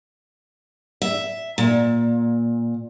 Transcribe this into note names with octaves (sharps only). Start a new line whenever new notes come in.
E5
A#2